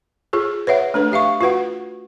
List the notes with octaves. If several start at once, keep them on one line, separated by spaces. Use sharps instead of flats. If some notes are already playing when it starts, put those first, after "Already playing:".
F4 G#4 A4
B4 C#5 E5 F#5
A3 D4 A4 B4
G4 E5 F5 C#6
F4 F#4 B4 F#5